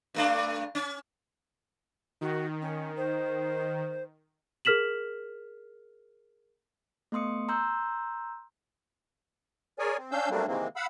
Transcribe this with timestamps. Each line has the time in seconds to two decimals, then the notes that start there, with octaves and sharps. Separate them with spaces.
0.15 G2 A3 D4
0.75 C#4
2.21 D#3 F#4
2.61 C#4
2.96 C5
4.65 G#4 A#4 F6 B6 E7 F#7
7.12 A3 B3 C6 D#6 C#7
7.49 A#5 C6 E6 G6
9.79 G#4 A#4 C#5 D5 G#5
9.98 C4
10.11 C#4 D4 F5 E6 G6
10.30 F#3 G3 A3 A#3 C4 D4
10.47 C3 D#3 E3 G#3 A#3 C4
10.76 F5 F#5 B5 E6